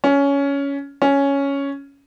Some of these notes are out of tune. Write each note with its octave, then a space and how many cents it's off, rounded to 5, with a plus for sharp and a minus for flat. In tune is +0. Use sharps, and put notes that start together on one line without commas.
C#4 +15
C#4 +5